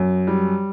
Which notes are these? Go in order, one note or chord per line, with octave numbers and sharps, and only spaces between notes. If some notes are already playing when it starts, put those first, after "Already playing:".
Already playing: F#2
G3